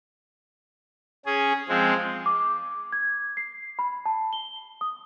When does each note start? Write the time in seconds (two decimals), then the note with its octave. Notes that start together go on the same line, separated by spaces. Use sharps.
1.26 C#4 G#4
1.69 F3 G#3 C4
2.26 D6
2.93 G#6
3.37 C7
3.79 B5
4.06 A5
4.33 G7
4.81 D#6